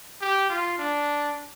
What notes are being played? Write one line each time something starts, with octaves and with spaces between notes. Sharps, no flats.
G4
F4
D4